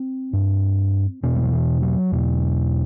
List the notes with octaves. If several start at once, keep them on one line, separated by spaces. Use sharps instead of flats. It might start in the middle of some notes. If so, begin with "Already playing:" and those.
Already playing: C4
G2
E2 B2 B3
G3
F#3
E3
F#3
E2 B2